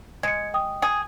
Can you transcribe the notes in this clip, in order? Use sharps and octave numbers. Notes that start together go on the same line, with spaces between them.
G#3 G#6 C#7
G5 D#6
G#4